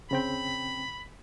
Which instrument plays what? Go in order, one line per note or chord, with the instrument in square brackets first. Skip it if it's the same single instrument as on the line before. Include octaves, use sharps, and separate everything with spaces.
[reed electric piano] C#3 C4 G5 [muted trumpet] B5